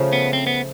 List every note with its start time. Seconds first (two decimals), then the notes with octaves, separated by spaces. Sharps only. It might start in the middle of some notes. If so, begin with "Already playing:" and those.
Already playing: C#3 F3 A3
0.13 B3
0.33 C4
0.47 B3